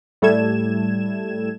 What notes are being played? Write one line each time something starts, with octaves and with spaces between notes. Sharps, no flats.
A2 G3 A3 A4 G#6 E7